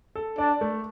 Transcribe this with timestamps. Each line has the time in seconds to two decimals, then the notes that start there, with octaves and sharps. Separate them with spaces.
0.15 A4
0.38 D4 D5
0.61 A3